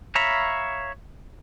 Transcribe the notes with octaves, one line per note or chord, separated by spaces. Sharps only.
C#5 E5 F5 A#5 B5